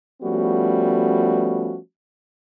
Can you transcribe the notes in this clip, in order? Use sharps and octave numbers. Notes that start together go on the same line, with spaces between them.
F3 G3 A3 B3 C#4 F#4